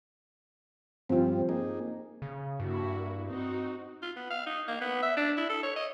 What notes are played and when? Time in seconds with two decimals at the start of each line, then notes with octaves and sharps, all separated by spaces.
1.09 G2 F3 C4 F4
1.49 A#3 D#4 G#4
2.22 C#3
2.60 G2 A#3 E4 F#4
3.27 C4 D#4 F#4
4.02 F4
4.16 B3
4.31 F5
4.46 D#4
4.68 A#3
4.81 B3
5.02 E5
5.17 D4
5.37 E4
5.49 A4
5.63 C#5
5.76 D#5